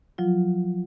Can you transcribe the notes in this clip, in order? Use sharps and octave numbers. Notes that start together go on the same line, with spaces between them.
F3 F#3 F4